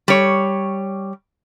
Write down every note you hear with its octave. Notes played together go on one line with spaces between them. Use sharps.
G3 C#5